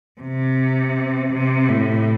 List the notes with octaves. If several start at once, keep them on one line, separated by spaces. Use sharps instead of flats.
C3
C3
A2